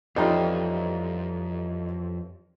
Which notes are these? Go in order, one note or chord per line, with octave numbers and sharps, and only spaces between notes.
A1 F2 G3 D#4 F4 D#5 F5 A#5